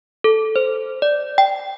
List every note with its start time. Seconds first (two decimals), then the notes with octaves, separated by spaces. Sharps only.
0.24 A4
0.56 C5
1.02 D5
1.38 G5